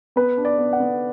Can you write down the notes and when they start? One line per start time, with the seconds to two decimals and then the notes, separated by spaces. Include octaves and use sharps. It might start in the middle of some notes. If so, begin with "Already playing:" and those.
0.16 B3 B4
0.37 D4
0.45 D5
0.58 B3
0.73 F#5
0.80 B3